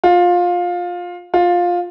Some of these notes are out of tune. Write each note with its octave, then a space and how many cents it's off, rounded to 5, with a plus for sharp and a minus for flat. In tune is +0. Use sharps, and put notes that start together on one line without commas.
F4 +20
F4 +15